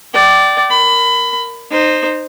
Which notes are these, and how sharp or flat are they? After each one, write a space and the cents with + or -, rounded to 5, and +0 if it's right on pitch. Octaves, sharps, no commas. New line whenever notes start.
D5 +0 G5 -35
A#4 +0 B5 +20
D#4 -20 C5 +0